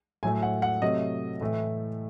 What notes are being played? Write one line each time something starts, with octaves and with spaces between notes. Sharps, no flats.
A2 F#3 A3 G#5
F#5
F#5
C3 F#3 A3 D#5
A2 E3 A3